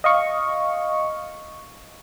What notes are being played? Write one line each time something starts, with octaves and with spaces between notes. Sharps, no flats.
D#5 F5 C#6